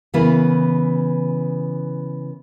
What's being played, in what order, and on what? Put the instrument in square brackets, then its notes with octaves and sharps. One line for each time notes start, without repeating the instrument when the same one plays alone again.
[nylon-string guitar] C#3 E3 B3 E4 A#4 B4